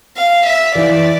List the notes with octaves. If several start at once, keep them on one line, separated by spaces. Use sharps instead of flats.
F5
E5
E3 D5